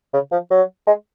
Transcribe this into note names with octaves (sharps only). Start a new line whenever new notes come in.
C#3
F3
F#3
G#3